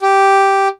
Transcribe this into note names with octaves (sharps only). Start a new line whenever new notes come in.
G4